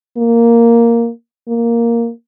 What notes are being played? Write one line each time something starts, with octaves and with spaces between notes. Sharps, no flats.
A#3
A#3